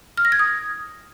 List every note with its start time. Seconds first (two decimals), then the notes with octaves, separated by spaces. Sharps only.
0.17 F6
0.25 A#6
0.32 G#6
0.39 D#6